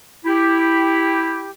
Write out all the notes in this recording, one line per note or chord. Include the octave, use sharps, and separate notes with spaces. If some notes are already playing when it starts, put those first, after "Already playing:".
E4 G4